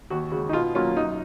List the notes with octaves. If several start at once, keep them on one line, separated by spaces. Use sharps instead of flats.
D#2 F#4
C#3 G#3 F#4
D#4
B2 F4
F#3 A#3 C#4 F4
F#2 D#4